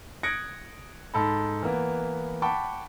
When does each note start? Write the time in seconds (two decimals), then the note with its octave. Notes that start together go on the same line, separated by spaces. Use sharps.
0.23 D#6 F#6 G#6 A#6 C#7 D7
1.14 G#2 A4 A5 B5
1.63 E3 A#3 B3
2.42 F#5 G5 A5 B5 C#6 D6